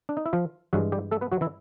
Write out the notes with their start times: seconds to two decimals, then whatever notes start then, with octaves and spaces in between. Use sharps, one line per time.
0.09 D4
0.17 D#4
0.26 E4
0.33 F3 F4
0.73 G2 E3 F#3 G#3 F#4
0.92 G3 G4
1.11 A3 A4
1.21 B3 B4
1.32 F#3 F#4
1.41 E3 E4